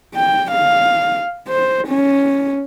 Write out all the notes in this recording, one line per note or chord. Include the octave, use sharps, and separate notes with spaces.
G5
F5
C5
C#4